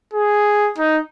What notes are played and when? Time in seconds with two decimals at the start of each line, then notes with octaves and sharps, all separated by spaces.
0.14 G#4
0.78 D#4